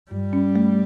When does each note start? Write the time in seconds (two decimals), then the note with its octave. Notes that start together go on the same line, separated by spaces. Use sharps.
0.11 G2 G3
0.33 C#4
0.56 A3